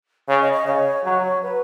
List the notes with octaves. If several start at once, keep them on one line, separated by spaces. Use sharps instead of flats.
C#3 C#5
D#5
D#5
C#3 C#5
F#3 C#5
B4